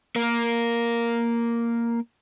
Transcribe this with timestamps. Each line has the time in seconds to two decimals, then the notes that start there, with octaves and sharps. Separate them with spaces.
0.16 A#3 A#4